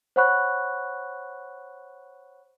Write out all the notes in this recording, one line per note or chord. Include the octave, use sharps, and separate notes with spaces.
C5 C#5 F#5 B5 C#6 F#6